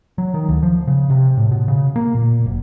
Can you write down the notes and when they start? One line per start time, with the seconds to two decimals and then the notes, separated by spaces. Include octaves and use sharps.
0.18 F#3
0.34 D#3
0.49 D2
0.63 F3
0.87 C#3
1.10 C3
1.37 A2
1.51 B2
1.68 C#3
1.96 A#3
2.15 A#2
2.46 F#1